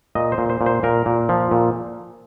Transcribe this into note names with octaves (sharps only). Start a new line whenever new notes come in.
A#2 D#5
C5
A#2
C5
A#2
C5
A#2 A#4
A#2
F3
A#2